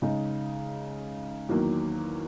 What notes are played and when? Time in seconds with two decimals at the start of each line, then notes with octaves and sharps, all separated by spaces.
0.02 C#3 G#3 D#4
1.49 E2 D#3 F#3 A#3